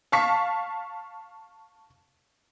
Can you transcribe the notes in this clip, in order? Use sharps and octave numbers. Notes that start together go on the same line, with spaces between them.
F5 A5 C#6 B6